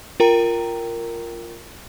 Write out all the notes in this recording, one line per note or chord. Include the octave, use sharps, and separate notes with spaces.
F4 A#4 G5 A#5